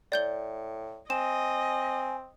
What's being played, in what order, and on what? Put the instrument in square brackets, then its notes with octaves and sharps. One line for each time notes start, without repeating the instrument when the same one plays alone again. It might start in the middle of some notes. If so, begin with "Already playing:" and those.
[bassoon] A2 [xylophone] D5 G6 G7
[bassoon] C4 [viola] D#5 [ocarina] G#5 [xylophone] E7